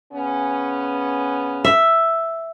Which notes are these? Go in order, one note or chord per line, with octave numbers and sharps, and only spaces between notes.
C#3 B3 C#4
E5